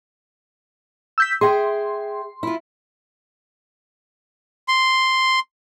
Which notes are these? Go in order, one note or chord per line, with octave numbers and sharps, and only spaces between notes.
E6 G6 B6
G#4 E5 G5 C6
E4 F4
C6